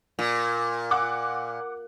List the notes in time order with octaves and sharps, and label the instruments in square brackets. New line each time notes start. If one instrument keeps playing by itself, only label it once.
[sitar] A#2
[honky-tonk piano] F#5 D6 F#6